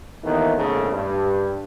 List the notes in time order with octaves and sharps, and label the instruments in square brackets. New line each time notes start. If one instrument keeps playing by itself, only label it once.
[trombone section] D#2 D#3 E3 A3 B3 D#4
A#1 E2 G#2 C#3 A3
G2